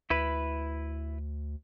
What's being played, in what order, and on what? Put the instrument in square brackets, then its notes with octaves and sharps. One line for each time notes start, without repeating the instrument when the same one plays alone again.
[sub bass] D2 [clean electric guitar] E4 B4